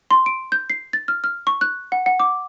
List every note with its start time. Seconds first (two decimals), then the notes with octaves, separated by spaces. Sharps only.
0.11 C6
0.26 D7
0.52 G6
0.70 C7
0.93 A6
1.08 F6
1.24 F6
1.47 C#6
1.61 F#6
1.92 F#5
2.06 F#5
2.20 D6